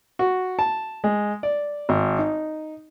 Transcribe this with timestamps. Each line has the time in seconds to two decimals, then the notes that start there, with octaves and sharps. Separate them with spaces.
0.19 F#4
0.59 A5
1.04 G#3
1.43 D5
1.89 G#1
2.19 D#4